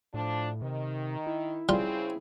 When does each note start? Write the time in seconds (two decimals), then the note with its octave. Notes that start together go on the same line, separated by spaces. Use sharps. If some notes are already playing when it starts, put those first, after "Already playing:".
0.14 A2 F3 D4
0.62 C3 D#3
1.27 E4
1.69 C#3 G3 C4 F4 G#4